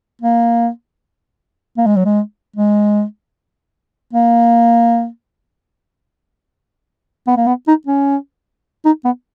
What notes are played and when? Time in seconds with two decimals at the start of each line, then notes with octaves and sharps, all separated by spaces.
0.22 A#3
1.77 A#3
1.86 G#3
1.96 F#3
2.05 G#3
2.56 G#3
4.13 A#3
7.27 B3
7.37 A#3
7.47 B3
7.67 D#4
7.87 C#4
8.85 D#4
9.05 B3